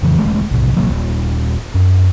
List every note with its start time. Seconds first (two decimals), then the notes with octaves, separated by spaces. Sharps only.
0.02 F2 C#3 E3
0.18 E1 D#3 G#3 A3
0.51 B1 A2 C3
0.77 A1 C3 F#3 A#3
0.89 D#1
1.74 F#2